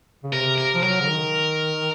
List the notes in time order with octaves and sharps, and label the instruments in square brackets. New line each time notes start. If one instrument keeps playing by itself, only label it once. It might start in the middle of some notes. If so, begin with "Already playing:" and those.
[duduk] C#3
[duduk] C3 [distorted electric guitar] A#4
[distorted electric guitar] A#4
[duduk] F3
[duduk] F#3 [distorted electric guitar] A#4
[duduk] C#3
D#3